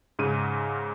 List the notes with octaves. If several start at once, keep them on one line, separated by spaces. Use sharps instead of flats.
G#2 C#3 D#7